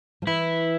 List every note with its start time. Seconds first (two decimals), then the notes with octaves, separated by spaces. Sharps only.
0.22 F3
0.27 E3 E4